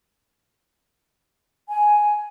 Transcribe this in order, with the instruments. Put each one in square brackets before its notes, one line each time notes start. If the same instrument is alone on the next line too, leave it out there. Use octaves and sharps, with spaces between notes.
[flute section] G#5